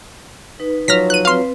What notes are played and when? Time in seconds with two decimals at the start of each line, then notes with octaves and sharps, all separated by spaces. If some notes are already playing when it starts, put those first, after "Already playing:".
0.60 D#4 B4
0.88 F3 F#3 F6 A#6 B6
1.10 F#6 D#7
1.25 C4 B4 F5 C6